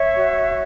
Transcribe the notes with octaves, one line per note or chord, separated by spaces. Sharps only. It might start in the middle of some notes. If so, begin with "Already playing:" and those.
Already playing: C#5 E5
F#4